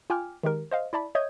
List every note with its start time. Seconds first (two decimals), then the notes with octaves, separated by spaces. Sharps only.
0.10 F4 G5 G#5 D6 F6
0.43 D#3 G#3 G4 A#4
0.71 C5 D#5 F5
0.93 E4 D5 A5 B5
1.15 C#5 D#5 E5 D#6 G6 G#6